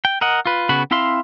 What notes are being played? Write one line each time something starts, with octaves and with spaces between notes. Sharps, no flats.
G5
A#4 D#5 F#5
F4 B4
C#3 B3 F#4 B5
C4 E4 E5 F5 C6